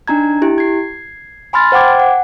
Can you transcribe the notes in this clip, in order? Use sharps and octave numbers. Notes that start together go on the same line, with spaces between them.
D4 D#4 A#5 G#6
E4 G4
G#6 C7
G#5 B5 C6 F6 A6
C5 F#5 G5 D6 G#6
F#5